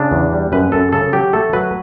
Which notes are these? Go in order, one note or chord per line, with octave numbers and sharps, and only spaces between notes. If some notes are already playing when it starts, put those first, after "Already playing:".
Already playing: C#3 D4
E2
G3
F#2 B4
F#2 A4
C#3 A4
F#3 G4
A3 A4
F#3 B4